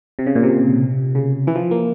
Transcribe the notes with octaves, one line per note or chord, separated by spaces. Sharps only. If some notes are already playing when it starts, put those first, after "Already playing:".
C3
C#3
A#2
C3
C#3
E3
F3
A#3